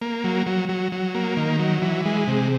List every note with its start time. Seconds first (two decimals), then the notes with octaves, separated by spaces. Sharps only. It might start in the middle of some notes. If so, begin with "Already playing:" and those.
0.01 A#3
0.24 F#3
0.46 F#3
0.69 F#3
0.92 F#3
1.15 A#3
1.37 D#3
1.59 F#3
1.82 E3
2.05 G#3
2.28 C3